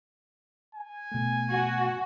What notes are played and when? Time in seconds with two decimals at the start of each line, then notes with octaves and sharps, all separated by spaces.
0.75 G#5
1.12 B2 A3
1.50 F#4